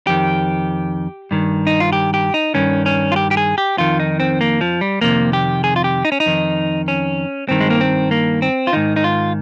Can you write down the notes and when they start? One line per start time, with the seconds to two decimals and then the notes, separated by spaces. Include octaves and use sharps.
0.07 F2 D#3 G4
1.31 G2 D#3
1.67 D#4
1.80 F4
1.93 G4
2.14 G4
2.34 D#4
2.54 G2 D#3 C#4
2.86 C#4
3.12 F4
3.16 G4
3.31 G4
3.37 G#4
3.58 G4
3.78 F2 D#3 F4
4.00 D#4
4.20 C4
4.41 A#3
4.61 F3
4.81 G3
5.01 F2 C3 D#3 A#3
5.33 G4
5.64 G#4
5.76 F4
5.84 G4
6.05 D#4
6.12 C#4
6.20 D#4
6.26 F2 D#3
6.88 C#4
7.49 G2 D#3 C4
7.60 G#3
7.70 A#3
7.81 C4
8.11 A#3
8.42 C4
8.67 F4
8.73 G#2 D#3 D#4
8.96 D#4
9.04 F4